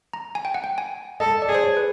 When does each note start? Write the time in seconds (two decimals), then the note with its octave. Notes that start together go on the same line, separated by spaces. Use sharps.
0.13 A#5
0.35 G#5
0.45 G5
0.54 F#5
0.64 G5
0.78 G#5
1.20 A4 D#5
1.42 D5
1.49 G#4
1.55 C5
1.64 C#5
1.77 B4